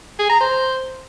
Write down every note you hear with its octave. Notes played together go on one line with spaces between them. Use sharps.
G#4
A#5
C5